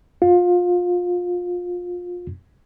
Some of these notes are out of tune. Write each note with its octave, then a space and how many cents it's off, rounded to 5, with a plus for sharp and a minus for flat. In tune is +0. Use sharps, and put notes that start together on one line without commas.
F4 +25